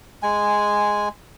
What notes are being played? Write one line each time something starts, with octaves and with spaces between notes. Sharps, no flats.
G#3 G#5